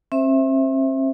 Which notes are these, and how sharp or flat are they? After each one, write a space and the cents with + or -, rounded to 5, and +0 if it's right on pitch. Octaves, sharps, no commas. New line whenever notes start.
C4 +45 C5 +0 E5 +0